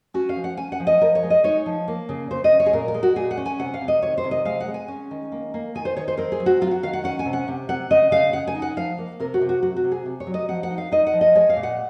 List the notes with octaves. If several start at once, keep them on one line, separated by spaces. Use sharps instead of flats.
C#4 F#4
F5
F3
F#5
C#4 G#5
F#5
F3
D#5
F3 A#4
C#5
G#3
D#5
D#4 C#5
F3
A#3
C#3
C#3 C5
D#5
C#3
C#5
G#4
A#2 A#4
A#4
G#3
F#4
A#2 G#4
F#5
C#4
G#5
C3 F#5
F5
C3
D#5
D#3 C#5
C5
C3
D#5
G#3 F5
F#5
G#3
G#5
C#4
D#3
A#3
A#3
D#3 G#5
C5
D#3 C#5
C5
C4 A#4
G#4
F#3
F#4
F#3 F4
F#4
D#3 F5
F#5
C#4 F#5
G#5
C3
F#5
C3
C3 F#5
C#3 D#5
C#3 F5
C#3 F#5
G#5
D#4
F#5
F3 F5
A#3
C3 A#4
F#4
C3
F#4
F#3 F#4
F#4
C3
G#4
C3
C#5
F#3
D#5
F3 F#5
F#5
D#4
F5
D#4 D#5
F#5
F3
D#5
G#3 C#5
F5
A#2
F#5